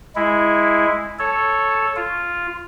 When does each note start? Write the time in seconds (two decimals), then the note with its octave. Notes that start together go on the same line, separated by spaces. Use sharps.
0.16 G#3 E4
1.19 A4 C#5
1.96 F4